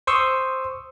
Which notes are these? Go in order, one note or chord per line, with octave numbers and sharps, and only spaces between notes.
C5 C6 C#6 D#6 E6